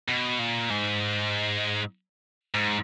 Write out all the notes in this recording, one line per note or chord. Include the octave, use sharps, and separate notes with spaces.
B2
A#2
G#2
G#2